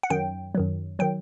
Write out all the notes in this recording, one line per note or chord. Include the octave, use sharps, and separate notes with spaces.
F#5
F#2 D#3 F#3 G5
F#2 D#3 F#3
D#3 F#3 G5